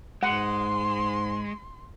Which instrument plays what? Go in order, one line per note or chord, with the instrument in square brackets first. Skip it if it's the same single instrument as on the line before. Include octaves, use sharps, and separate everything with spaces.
[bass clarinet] G#2 [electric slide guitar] G#3 [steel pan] F#5 [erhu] C6